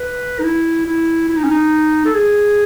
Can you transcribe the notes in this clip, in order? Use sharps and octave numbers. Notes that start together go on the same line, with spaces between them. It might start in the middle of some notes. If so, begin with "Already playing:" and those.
Already playing: B4
D#4
E4
E4
E4
D#4
C#4
D#4
A4
G#4